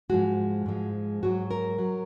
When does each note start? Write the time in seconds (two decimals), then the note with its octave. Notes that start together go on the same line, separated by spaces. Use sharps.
0.10 G#2 F3 G#3 F#4
0.66 G#2 F3 G#3
1.23 G#2 F#3 F#4
1.51 A#4
1.78 F#3